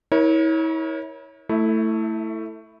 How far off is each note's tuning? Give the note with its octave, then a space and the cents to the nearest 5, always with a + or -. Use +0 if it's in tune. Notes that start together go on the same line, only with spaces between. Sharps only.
E4 -35 A#4 +35 C#5 +0
A3 +15 E4 +0 E5 -35